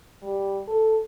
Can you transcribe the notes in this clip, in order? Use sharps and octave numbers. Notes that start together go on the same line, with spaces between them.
G3
A4